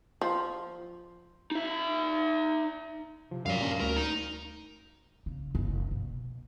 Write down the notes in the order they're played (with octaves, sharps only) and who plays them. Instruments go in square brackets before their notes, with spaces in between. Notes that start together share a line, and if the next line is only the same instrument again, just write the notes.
[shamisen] F3
[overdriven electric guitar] D#4 E5
[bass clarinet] C3 [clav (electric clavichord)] F3
[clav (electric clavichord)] F#2 G3 [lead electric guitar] D5 F5
[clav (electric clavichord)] G3 A#3 D4 [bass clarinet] C#4
[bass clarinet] D2 [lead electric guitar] A#4
[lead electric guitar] D#4
[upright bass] C#3
F#1
B2